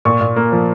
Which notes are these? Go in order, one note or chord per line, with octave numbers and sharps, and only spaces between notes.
A#2 C#6
A#2
A#3
F3